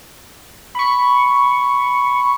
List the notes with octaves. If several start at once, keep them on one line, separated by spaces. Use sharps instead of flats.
B5 C#6